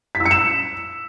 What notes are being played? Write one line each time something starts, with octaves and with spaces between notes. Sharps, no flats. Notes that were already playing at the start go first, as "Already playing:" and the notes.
B6
E6
C#7
E7